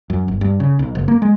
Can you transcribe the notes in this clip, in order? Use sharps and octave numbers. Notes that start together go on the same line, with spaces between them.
F#2
G1
G2
C#3
B1
F#1
A#3
G#3